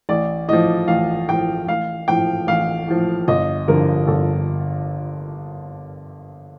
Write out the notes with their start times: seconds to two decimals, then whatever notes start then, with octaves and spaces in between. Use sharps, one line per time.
0.09 A1 D5
0.48 A2 F3 D#5
0.88 A1 F5
1.28 A2 F3 G5
1.67 A1 F5
2.08 A2 F3 G5
2.47 A1 F5
2.88 A2 F3
3.28 G1 D#5
3.68 G2 D3 F3 A#4
4.07 G1 A4